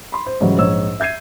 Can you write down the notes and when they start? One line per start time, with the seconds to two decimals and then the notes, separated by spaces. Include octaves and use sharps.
0.12 B5 C6
0.26 C5
0.41 G#2 C#3 E3 F#3 G3
0.58 A#1 G#2 C#5 E6
1.00 E5 G6 G#6 C7 D#7